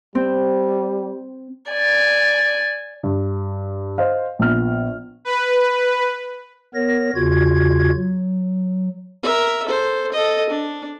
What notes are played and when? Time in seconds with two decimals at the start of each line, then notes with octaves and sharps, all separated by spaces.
0.15 G3 C4
1.70 D5 G#5
3.03 G2
3.98 C5 D#5 F5
4.39 A#1 B3 F6
5.25 B4
6.75 B3 A#4 C#5 A#6
7.15 E2 C#3 F4 F#4 G#6
7.95 F#3
9.23 A#4 E5
9.66 A4 C5
10.12 A4 D#5
10.50 D4